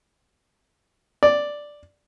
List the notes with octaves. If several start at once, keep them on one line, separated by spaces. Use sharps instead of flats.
D5